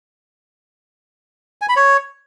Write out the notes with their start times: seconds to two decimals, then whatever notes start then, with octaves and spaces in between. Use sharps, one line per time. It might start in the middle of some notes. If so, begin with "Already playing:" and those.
1.62 G#5
1.69 B5
1.76 C#5